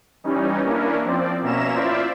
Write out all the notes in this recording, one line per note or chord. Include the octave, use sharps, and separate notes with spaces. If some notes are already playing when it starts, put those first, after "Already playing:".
E3 G3 C#4 D#4
A#3 C#4 D4 E4 A#4
F3 C4 D5
B2 A#3 C#4 E5 A#5 E7
E4 F4 C5 D5 E5